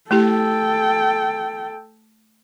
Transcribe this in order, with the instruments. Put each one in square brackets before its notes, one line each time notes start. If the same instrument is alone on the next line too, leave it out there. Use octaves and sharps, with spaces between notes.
[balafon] A3 E4 G4 [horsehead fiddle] A4 G5